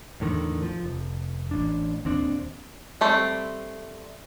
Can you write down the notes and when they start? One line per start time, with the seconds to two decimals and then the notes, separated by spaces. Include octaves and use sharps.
0.20 E2 A2 D3 D#3
0.63 F3
0.84 F1
1.51 A1 D4
2.04 D1 D#2 C4 D4
3.01 G3 A3 C4